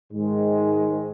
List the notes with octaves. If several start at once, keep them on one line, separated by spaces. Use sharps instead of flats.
G#2 D#3 G#3